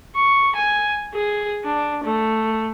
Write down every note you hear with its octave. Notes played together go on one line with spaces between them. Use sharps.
C#6
G#5
G#4
D4
A3